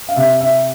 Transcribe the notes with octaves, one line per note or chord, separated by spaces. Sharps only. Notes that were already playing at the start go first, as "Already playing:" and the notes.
F5
C3 E5
E5